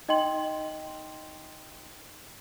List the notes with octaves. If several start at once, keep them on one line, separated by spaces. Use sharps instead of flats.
D#4 D#5 G5 C6 F#7